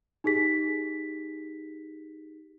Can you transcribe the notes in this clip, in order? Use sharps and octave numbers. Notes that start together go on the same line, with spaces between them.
D#4 G4 G#4 B6